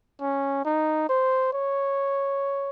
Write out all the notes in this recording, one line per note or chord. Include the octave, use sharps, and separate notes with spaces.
C#4
D#4
C5
C#5